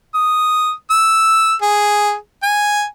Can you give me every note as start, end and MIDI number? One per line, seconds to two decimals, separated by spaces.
0.14 0.71 87
0.90 1.53 88
1.62 2.14 68
2.43 2.84 80